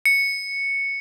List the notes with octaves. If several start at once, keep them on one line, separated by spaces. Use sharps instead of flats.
C#7